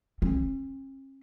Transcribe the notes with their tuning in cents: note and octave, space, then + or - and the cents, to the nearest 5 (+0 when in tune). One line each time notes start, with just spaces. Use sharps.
C#4 -45